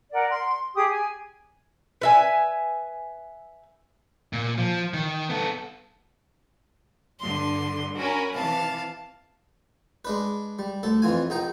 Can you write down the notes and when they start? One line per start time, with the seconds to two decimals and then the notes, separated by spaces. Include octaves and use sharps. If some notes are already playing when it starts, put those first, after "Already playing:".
0.13 A#4 D5 F#5
0.30 C6
0.75 G4 G#4 D#6
0.90 G#5
2.01 B4 E5 G#5
4.33 A#2
4.58 F3
4.94 D#3
5.30 B3 A4
7.20 G2 D3 C6
7.96 C#4 F#4 A#4 G#5 B5
8.34 C3 E3 F5 A5 A6
10.05 G#3 D4 B4
10.59 G3
10.83 D2 A4
11.02 F2 E3 F4 G#5
11.30 A#1 D#4 G5 A#5